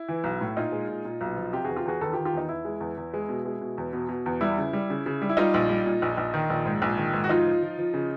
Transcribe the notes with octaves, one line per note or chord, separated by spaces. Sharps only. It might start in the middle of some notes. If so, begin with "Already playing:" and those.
Already playing: E4
E3
B1
A2
A#2 D#4 F4
G#3
A#2
A#2
B1
F3
C3 F4 G4
E2 F#4 G#4
F4 G4
E2 F#4 G#4
D#3 A4 B4
F4 G4
D#3
F4 G4
E2 D#4
E2 E4
G#3
E2
E2
G#3
B2
G#3
B2
E2
B2
B2
E2
G3 E4
C#3
G3
C#3
C#3
G3
E4
G3 D#4 F4
A#1
G3
A#2
A#1
A#1
D#3
A#1
G#2
A#1
D#3
G#2
F#4
F3 D#4 F4
F3
F3
F3
C#3